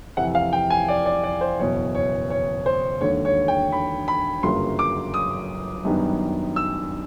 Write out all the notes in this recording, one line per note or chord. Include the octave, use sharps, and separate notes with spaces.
F2 C3 E3 F#5
F5
G5
G#5
D5
D5
D5
C5
F#1 E2 B2 C#5
C#5
C#5
C5
E1 D#2 D3 C#5
C#5
G5
B5
B5
G1 F#2 C#3 F#3 A#3 C6
D6
D#6
F#2 D#3 G3 B3 D4
E6